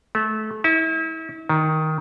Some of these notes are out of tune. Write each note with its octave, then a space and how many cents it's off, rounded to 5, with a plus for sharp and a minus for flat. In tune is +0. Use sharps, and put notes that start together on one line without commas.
A3 -25
E4 -35
D#3 +10